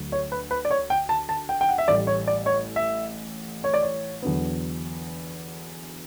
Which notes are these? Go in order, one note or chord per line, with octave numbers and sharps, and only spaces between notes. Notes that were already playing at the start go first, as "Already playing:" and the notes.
Already playing: D2 D3 F#3
C#5
B4
B4
D5
C#5
G5
A5
A5
G5
G5
F#5
E5
A1 A2 G3 D5
C#5
D5
C#5
E5
C#5
D5
C#5
E2 D3 F#3 B3